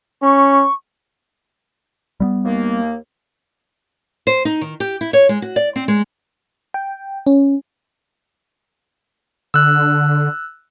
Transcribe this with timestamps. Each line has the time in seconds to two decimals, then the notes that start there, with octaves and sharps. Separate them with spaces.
0.22 C#4 C#6
2.20 G3 A3 B3
2.45 D#2 A#3
4.27 C5
4.45 D#4
4.61 D#3
4.80 G4
5.01 E4
5.13 C#5
5.29 G#3
5.42 F#4
5.56 D5
5.76 C4
5.88 G#3
6.74 G5
7.27 C#4
9.54 D3 E6 F#6